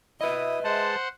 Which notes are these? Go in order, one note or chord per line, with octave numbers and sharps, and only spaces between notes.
E4 B4 D#5 E5 D#6
G#3 C5 F#5 A5